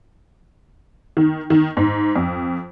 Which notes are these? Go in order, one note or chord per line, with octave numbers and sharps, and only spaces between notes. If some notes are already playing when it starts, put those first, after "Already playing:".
D#3
D#3
G#2
F2